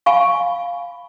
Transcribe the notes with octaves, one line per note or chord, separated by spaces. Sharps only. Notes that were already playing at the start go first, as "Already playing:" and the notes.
F5 G#5 B5 C#6